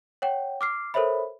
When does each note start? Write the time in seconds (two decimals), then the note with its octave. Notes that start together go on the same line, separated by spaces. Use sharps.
0.22 C#5 F#5 G5
0.61 D6 F6 C7
0.94 A4 A#4 C5 C#5 E5 B5